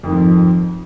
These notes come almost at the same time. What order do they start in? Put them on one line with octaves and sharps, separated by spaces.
F2 D#3 G#2 F3